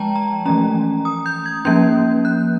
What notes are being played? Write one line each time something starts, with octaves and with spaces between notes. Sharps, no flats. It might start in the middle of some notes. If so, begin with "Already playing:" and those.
Already playing: F3 G#3 G5 A5 A#5
A#5
E3 A3 C#4 A#5
D#6
G6
G#6
F3 A#3 C#4 G6
F#6